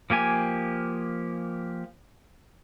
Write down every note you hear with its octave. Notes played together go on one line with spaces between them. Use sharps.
F3 A#3 G4 G#5